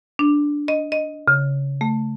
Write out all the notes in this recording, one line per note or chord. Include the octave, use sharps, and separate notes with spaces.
D4
D#5
D#5
C#3
A3